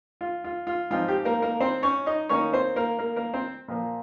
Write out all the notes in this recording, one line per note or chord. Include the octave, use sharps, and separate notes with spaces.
F4
F4
F4
G#2 F3 C4 D#4 F4
G4
A#3 A#4
A#3 A#4
C4 C5
C#4 C#5
D#4 D#5
D#3 A#3 C#4 D#4 C#5
C4 C5
A#3 A#4
A#3 A#4
A#3 A#4
C4 C5
A#2 F3 A#3